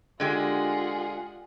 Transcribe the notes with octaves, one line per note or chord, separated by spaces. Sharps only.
D3 G#3 F4 G4 G#4 F#5